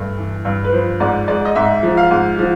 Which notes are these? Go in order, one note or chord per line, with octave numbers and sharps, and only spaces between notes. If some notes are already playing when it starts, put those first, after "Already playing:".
Already playing: G2 A3
E3
G2
B4
F3 C5
G#2 D5
G#3 D5
D#5
G#2 E5
F3
F5
G#2
F3